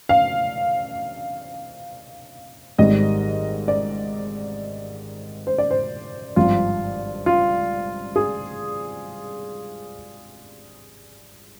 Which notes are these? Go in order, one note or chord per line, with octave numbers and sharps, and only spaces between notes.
F5
G#1 G#2 D#3 G3 D#5
D5
C5
D5
C5
G#1 G2 F3 F4
F4
G#4